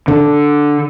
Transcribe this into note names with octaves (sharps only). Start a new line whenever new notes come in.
D3